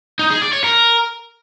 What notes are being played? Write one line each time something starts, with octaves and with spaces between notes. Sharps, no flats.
D#4
G#4
D5
C#5
A#4